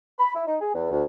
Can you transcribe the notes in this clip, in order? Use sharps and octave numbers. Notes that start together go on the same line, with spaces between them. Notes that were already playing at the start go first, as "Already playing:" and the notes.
B5
E4
D#4
G#4
E2
D2